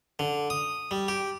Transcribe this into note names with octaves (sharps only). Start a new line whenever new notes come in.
D3
D#6
G3
G4